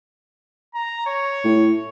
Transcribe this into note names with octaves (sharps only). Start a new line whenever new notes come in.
A#5
C#5
A2